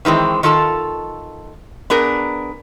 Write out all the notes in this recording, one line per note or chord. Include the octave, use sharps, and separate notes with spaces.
D#3 E3 G#3 C4
D#3 F4 A4 A5
B3 D4 G#4 A#4